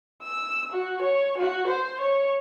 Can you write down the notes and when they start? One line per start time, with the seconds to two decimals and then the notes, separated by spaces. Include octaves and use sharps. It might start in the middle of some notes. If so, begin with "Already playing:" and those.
0.22 E6
0.73 F#4
1.02 C#5
1.38 F#4
1.67 C5
2.01 C#5